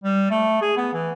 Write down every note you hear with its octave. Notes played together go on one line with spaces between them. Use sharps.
G3
A3
G#4
B3
E3